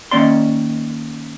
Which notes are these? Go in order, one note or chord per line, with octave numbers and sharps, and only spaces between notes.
D#3 A#3 C#4 D5 C6